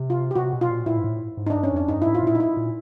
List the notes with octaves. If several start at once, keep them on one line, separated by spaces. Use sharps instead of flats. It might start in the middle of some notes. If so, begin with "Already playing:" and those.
Already playing: C3
F4
G4
C3 F#4
B2
F4
A#2
A#2 E4
G#2
A2
G#2
D#4
D4
G2
C#4
F2 D4
G2 D#4
E4
A2
F4
A#2 E4
D#4
E4
A#2